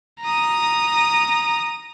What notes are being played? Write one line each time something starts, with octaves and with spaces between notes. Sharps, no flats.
A#5 D#6